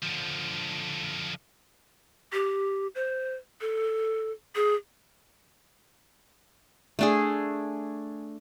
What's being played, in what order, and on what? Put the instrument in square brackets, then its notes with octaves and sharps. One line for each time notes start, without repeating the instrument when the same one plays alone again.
[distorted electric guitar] D3 F3
[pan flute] G4
C5
A4
G#4
[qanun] A3 D4 G#4